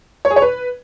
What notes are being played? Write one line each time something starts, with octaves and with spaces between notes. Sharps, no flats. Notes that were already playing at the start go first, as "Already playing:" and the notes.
C#5
G#4
C#5
B4